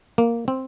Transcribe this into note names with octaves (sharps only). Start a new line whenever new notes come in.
A#3
C4